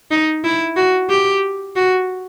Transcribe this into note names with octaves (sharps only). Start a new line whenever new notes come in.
D#4
E4
F#4
G4
F#4